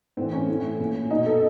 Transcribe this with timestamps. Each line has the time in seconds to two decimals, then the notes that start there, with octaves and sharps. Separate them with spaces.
0.17 A2 E3 C4
0.33 C#4
0.48 A2 E3
0.79 A#2
1.11 B2 D#4
1.26 A4